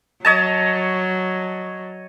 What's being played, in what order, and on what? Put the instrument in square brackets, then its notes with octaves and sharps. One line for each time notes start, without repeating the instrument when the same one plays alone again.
[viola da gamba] F#3 [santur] C#5 D#5 A5